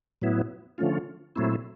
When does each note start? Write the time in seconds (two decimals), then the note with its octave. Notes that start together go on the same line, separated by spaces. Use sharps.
0.22 A2 F#3 B3 E4
0.78 D3 F3 A3 C#4 F4
1.36 A#2 F#3 A3 C4 E4